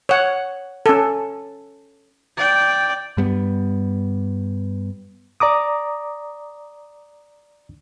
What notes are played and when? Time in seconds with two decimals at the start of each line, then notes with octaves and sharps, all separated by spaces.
0.09 C#5 F#5
0.86 C#4 A4
2.37 D5 G5
3.17 G2 G3 B3
5.40 D5 A#5 D6 D#6